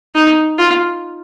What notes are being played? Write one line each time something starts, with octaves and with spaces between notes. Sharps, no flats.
D#4
F4